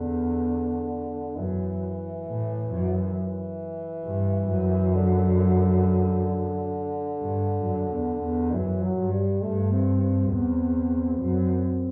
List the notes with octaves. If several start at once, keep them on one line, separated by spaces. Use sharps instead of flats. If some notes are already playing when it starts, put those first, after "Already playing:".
Already playing: E2 D3
F#2 E3
A2
F#2
E3
G2
F#2
D3
G2
F#2
E2
E2
F#2 E3
F#3
G2
G3
G2 A3
C4
C4
E2 C4
F#2